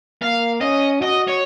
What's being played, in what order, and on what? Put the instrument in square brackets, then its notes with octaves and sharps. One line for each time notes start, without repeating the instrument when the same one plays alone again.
[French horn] A#3 [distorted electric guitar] F5
[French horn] C#4 [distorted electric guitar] D#5
[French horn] F#4 [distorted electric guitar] D#5
[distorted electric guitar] C#5